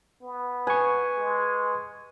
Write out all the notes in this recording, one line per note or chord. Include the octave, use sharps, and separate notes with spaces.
B3
B4 G#5 C#6
G#3